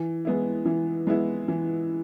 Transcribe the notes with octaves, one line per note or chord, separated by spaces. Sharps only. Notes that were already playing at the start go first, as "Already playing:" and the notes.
Already playing: E3
G#3 B3 E4
E3
G#3 B3 E4
E3